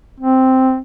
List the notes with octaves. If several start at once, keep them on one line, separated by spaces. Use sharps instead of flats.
C4